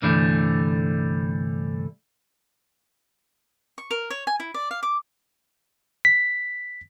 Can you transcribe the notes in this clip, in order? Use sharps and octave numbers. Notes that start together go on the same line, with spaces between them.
C2 G2 D3 E3 G3 A3
C#6
A#4
C#5
G#5
E4
D5
F5
D6
B6